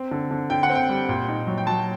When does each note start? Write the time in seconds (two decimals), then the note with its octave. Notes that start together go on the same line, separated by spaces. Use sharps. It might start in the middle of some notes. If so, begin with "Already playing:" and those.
Already playing: C4
0.11 D3
0.31 D3
0.50 D3 G5
0.63 F#5
0.69 C4
0.75 G5
0.89 G3
1.09 A#2
1.28 D#4
1.47 F#3
1.58 G5
1.67 F#3 A5